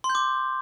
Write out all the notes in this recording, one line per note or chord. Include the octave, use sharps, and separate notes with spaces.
C6
G6
D6